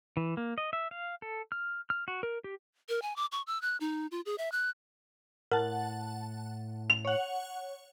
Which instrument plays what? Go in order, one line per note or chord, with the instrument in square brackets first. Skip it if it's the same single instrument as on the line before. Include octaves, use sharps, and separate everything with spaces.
[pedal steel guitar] E3
A#3
D#5
E5
F5
A4
F6
F6
F#4
A#4
G4
[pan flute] A#4
G#5
D6
C#6
E6
F#6
D#4
F4
G#4
E5
F#6
[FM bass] A2 [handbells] A#4 [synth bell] F#5 A5
[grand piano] F7
[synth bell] C#5 F#5